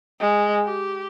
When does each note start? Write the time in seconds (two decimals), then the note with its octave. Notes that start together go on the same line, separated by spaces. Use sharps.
0.20 G#3
0.64 G4